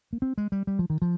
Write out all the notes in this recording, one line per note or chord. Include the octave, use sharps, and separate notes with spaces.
A#3
C4
G#3
G3
G3
F3
D#3
F3